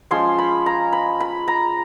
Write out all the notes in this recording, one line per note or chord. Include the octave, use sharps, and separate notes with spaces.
F3 G#3 C#4 C6
B5
A#5
B5
B5
A#5